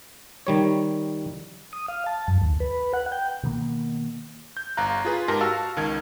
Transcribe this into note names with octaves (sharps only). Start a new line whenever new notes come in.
D#3 G3 C#5
D#6
F5
A5
F#2
D#2
B4
F#5
G5
B2 D#3 A#3
G6
G1 F5 A#5 F#6
F4 G#4 B4
G#2 G4 A#4 A5 A#6
F#4 F5 A5 E6 F6
C#2 D#3 G#6